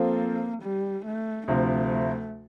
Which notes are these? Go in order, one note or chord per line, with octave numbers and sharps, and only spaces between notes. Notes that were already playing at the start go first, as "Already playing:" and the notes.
Already playing: F3 A#3 C4 F4 A4
G3
A3
D2 C3 F3 A3